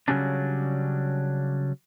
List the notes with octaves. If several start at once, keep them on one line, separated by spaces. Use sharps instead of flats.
C#3 E3 F#3 G3 C#4 D4